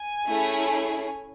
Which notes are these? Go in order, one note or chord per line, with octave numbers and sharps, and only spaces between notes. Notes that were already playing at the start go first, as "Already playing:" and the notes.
Already playing: G#5
A3 C#4 E4 G#4